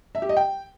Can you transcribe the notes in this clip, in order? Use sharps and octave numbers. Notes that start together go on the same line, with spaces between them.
E5
G4
D#5
G5